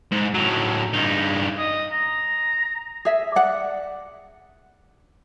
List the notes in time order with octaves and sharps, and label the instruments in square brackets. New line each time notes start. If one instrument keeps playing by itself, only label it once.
[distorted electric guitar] G#2
A2 F#3
G2 D#4
[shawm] D#5
A#5
[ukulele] G#4 E5
G#4 D5 F#5